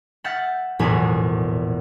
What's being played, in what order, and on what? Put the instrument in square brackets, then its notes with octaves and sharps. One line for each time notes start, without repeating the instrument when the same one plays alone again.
[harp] E5 F#5 F6 G6 A6
E1 A#1 E2 A2 B4 G#5